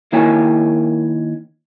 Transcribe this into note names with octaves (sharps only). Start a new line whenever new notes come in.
D#3 A#3 E4 C#5 G5 G#5